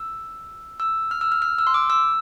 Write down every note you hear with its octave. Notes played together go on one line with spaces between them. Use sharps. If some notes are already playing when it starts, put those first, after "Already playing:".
Already playing: E6
E6
F6
E6
F6
F6
E6
C6
D6
E6